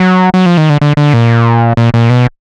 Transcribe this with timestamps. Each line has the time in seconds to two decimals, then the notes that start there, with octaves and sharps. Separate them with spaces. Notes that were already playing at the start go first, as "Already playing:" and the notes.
Already playing: F#3
0.34 F#3
0.46 F3
0.57 D#3
0.70 D3
0.81 D3
0.97 D3
1.14 A#2
1.77 A#2
1.94 A#2
2.10 B2